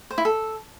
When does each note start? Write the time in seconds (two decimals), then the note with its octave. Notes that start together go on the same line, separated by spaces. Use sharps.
0.11 C5
0.18 E4
0.25 A4